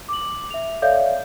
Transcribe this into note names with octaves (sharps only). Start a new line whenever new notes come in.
D6 F#7
E5 F7
A4 C#5 D5 E5 F5 G6